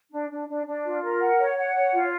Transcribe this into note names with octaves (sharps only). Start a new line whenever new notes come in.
D4
D4
D4
D4
F4
A#4
F#5
C#5
F#5
C#5
F4